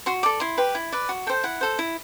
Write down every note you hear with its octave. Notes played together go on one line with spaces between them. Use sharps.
F#4 C6
A4 D5 D6
E4 C6
G4 B4
E4
B4 D5
F#4
A4 C5 G5
E4 F#5
A4 C5
E4